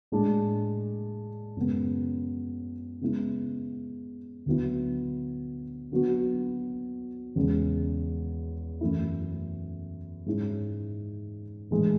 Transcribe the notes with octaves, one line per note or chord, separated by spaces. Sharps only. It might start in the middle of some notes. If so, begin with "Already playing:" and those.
A2 G#3 D4
F#2 C#3 G#3 B3
C#3 G#3 B3 E4
D2 D3 F#3 B3 E4
D3 F#3 B3 F#4
E2 C#3 G#3
F#2 E3 A3 E4
G#2 G#3 C#4 E4
A2 E3 G#3 D4